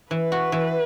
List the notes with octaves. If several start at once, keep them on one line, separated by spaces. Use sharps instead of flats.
E3 B4
F#4
E3